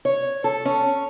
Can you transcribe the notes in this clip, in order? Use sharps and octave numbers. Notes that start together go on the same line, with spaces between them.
C#5
A4
C#4